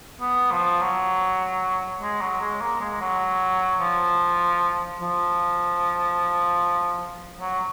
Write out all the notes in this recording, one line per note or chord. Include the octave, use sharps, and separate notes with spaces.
B3
F3
F#3
G#3
F#3
G#3
A#3
G#3
F#3
F3
F3
F#3